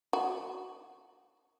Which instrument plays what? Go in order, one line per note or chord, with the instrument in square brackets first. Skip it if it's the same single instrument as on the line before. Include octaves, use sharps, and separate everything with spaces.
[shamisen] F#4